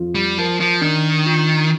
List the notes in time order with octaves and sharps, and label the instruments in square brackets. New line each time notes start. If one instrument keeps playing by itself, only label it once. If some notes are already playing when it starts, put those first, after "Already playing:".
Already playing: [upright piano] F2 F4
[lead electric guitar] G3
[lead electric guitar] F3 [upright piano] A#4
[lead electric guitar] F3
[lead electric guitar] D#3 [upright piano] D4
[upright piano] F4